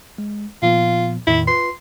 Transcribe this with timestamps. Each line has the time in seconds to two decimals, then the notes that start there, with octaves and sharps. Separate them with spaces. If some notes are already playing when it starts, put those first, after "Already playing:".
0.18 G#3
0.62 A#2 F3 B3 F4
1.27 E2 A2 D#3 E4
1.48 F4 B4 C6